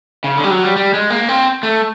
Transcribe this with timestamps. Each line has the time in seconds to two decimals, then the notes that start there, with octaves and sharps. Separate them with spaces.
0.24 C#3
0.37 D3
0.44 G3
0.50 F#3
0.63 G3
0.76 G3
0.94 G#3
1.10 A#3
1.29 C4
1.63 A3